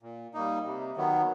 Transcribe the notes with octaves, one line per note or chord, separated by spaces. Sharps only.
A#2
G3 A#3 D#4
C3
D#3 F#3 B3